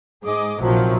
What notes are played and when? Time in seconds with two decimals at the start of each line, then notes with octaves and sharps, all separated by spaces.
0.24 G#2 G#4 D#5 D6
0.62 A#1 C3 D#3 F3 F#3